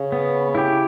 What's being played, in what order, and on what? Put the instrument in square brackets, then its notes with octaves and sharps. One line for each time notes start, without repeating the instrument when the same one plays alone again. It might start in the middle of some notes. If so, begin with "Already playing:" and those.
Already playing: [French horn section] C#3
[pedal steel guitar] B3
E4 G4